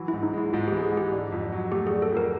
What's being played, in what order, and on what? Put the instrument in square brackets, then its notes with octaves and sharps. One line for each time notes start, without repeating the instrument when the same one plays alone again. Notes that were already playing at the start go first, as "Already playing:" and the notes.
Already playing: [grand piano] E3 F#3
[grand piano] G#2 [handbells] E4
[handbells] D#4
[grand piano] G#3 [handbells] E4
[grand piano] G#2 [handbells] F4
[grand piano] E3 [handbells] G4
[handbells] G#4
[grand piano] G#2
[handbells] G4
[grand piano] D3
F2
F#3
[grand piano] A3 [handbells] G4
[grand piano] D3 [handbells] G#4
[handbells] A4
[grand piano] F2 [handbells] A#4